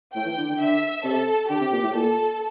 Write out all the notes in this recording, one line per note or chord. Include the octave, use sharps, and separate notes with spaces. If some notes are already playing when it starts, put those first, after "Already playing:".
A2 G5
E3
D3
D3
D3 E5
C3 A4
D3 G4
C3
A#2
A2
A#2 A4